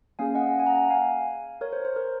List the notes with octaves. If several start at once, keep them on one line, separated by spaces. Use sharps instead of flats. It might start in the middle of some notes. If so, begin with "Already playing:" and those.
A#3 C#4 G#4 F5 G#5
D#5 F#5
G#5
F#5 A#5
F5 G#5
A#4 C#5
C5
C5
A#4